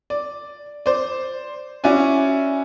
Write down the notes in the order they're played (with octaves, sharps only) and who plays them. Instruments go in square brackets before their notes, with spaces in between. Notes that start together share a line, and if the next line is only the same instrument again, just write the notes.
[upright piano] D5
C5 D5
C#4 E4 F#4 D5 G#5